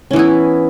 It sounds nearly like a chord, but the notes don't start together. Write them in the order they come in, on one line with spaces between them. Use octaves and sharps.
C#4 E3 B3 E4